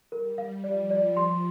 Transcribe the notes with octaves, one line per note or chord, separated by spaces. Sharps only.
G3 A#4
F5
F3 D5
D5
F3 C6